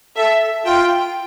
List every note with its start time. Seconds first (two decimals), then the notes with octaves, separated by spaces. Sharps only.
0.16 A4 E5
0.66 F4 G5